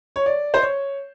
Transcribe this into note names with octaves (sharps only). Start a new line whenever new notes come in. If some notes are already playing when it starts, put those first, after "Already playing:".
C#5
D5
C5
C#5